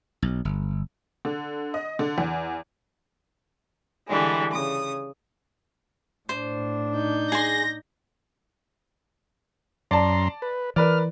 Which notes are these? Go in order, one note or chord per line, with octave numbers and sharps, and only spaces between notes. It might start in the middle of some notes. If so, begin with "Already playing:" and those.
B1
G1
D3
D#5
D3
E2
D3 E3 G3 G#3
C#3 D#6
A2 D4 C5
D#4 G6
G#4 C6 A#6
F#2 D5 A5 A#5 C6
B4
E3 A#4 B4 D5 F6